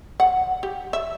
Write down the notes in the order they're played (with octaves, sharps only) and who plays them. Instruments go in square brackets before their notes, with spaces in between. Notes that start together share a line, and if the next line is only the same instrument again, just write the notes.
[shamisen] F#5
G4
E5